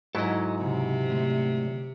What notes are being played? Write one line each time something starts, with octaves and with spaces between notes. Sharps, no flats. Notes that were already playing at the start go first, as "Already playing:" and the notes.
G#2 F#3 E4 A4 D#5
C#2 C3
D3 A3